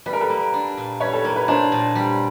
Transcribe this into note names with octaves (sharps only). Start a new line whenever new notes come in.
G3 B4
A#4
A4 B4
A#3
D4
A#2
G3 B4 C#5
A4
A#3 A#4
B4
D4 A#4 C5
A#2
G3